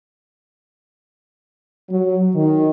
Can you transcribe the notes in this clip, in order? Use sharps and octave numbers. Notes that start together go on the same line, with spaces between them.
F#3
D#3